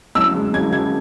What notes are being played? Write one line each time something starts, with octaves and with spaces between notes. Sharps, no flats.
F#2 E6
G#3
F#2 G#6
C#3 G#6